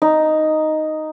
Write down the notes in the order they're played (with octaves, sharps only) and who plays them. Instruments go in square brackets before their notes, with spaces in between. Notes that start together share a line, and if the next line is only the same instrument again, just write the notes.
[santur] D#4